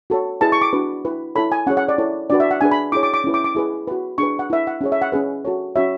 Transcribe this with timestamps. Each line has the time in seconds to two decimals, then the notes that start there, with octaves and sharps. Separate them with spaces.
0.10 F#4 A4 C#5
0.41 E4 G#4 B4 A5
0.52 C#6
0.62 D6
0.73 D4 F#4 B4
1.05 E4 B4
1.35 E4 A4 C#5 B5
1.52 G#5
1.67 C#4 F#5
1.70 G#4 C#5
1.77 F#5
1.89 D5
1.98 E4 A4 C#5
2.30 D4 F#4 B4 D5
2.40 E5
2.51 F#5
2.61 D4 G#4 B4 G#5
2.71 B5
2.92 E4 G#4 C#5 D6
3.03 D6
3.14 D6
3.24 C#4 E4 B4
3.34 D6
3.44 D6
3.55 E4 G#4 B4
3.87 F#4 B4
4.18 D4 G#4 B4 C#6
4.39 F#5
4.50 E4 B4 E5
4.67 F#5
4.81 C#4 G#4 C#5
4.92 E5
5.02 F#5
5.12 C#4 G#4 B4
5.45 F#4 A4 C#5
5.76 C#4 F#4 C#5 E5